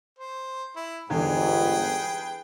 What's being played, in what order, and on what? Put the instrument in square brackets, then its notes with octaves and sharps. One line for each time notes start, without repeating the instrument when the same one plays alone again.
[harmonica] C5
E4
[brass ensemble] G1 G#2 [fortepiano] E2 D3 [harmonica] G#4 B4 G5